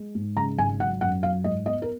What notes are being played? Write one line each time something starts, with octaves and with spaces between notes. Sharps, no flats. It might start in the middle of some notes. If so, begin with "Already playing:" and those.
Already playing: G#3
G#2
C#3 A#5
G#1 G#5
F#3 F#5
F#2 F#5
F#3 F5
G#2 D#5
B3 D#5
A#4